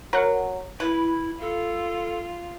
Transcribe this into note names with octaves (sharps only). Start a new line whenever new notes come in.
F#3 A#4 F#5
E4 B4
F4 A4